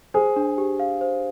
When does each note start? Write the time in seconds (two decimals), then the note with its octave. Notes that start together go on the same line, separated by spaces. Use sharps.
0.14 G#4 C5
0.36 D4
0.58 G4
0.80 F5
1.01 C5